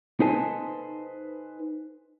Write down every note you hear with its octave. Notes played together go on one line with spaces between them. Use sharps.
D#4 A4 B4 C5 G#5 A5